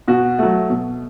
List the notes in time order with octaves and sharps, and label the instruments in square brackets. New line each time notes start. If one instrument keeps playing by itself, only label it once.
[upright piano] B2 F#4
F#3 A3
B2